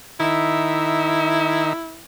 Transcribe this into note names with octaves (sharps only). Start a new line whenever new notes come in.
D#3 D#4 E4 E5